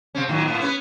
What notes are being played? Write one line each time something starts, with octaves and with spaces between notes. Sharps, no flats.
C3 C4 C#4
A2 D#3 F#3
A2 B3
B3 C#4 B4